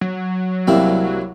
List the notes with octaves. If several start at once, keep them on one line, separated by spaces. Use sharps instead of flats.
F#3
C2 G3 A#3 C4 E4